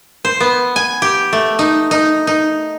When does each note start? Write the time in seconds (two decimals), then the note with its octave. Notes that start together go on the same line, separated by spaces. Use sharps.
0.25 C5
0.40 B3
0.76 G#5
1.02 G4
1.33 A3
1.59 D#4
1.91 D#4
2.27 D#4